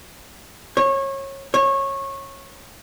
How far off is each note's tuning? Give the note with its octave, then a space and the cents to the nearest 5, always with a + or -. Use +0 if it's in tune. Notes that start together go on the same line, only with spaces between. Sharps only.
C#5 -25
C#5 -20